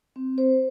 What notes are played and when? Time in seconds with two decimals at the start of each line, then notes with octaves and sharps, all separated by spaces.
0.16 C4
0.38 C5